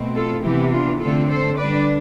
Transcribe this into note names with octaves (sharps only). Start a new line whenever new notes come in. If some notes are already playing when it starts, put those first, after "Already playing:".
Already playing: B2 A3 C4
F4 A4
C3 E3 B3 E4 G4
D4 F4
D3 A3 C4 F4 A4
A4 C5
D3 G3 D4 B4 D5